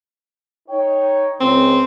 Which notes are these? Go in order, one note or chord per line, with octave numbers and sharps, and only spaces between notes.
D#4 C#5 G5
C#2 C#3 C4